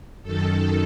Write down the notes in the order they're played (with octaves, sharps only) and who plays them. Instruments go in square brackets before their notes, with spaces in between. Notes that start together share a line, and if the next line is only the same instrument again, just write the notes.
[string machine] F#2 D#3 A4